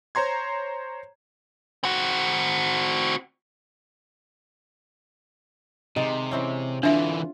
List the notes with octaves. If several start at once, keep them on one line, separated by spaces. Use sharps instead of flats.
C5 C#5 A#5 C6 G#6
C4 F#4
C3 D#3 G#3 D5
E3 C4 C#4
D3 E3 D4 F4 E5